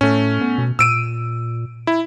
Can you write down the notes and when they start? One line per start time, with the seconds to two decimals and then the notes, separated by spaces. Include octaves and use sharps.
0.01 A2 A3 C#4
0.41 B3
0.58 B2
0.79 A#2 E6 D7 D#7
1.87 E4